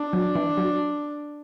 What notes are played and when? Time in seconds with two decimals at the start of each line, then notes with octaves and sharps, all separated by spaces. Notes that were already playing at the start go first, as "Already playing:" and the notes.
Already playing: D4
0.13 F#3
0.35 E3
0.57 F#3